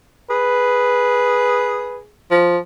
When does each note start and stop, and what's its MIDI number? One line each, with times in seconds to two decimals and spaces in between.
0.30 2.13 68
0.30 2.00 71
2.31 2.57 53